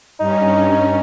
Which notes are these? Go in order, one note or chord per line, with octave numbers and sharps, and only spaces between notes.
G2 C#4 D#4